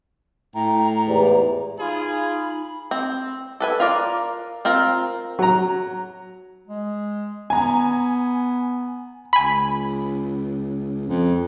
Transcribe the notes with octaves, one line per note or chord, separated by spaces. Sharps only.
A2 G5 A#5
E2 G#2 G4
D#4 F4 G#4 B5
C4
A4 B4 G#5
F4 A#4 D5
C4 F4 A#4
F#3 A#5
G#3
B3 G#5 A#5
C#2 G#5 B5
F2